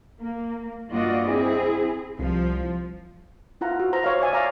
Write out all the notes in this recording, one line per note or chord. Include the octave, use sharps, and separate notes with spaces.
A#3
G2 A#3 F4 F#4 D5 D#5
C4 E4 G#4
C2 F3
E4 F4 F#5 A#5
F#4
C5 A#5
C#5 F5
C#5 D5 E5 G#5
D5 F5 A#5 C#6